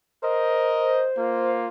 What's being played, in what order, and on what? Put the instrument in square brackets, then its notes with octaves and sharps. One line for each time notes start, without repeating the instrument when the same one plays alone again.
[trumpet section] A#4 D#5 [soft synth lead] C5
[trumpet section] A#3 F4